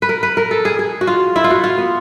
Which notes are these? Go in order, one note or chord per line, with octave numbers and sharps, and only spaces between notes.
B4
A#4
B4
A#4
A4
G#4
G#4
F#4
F4
E4
F4
F#4
F4
B3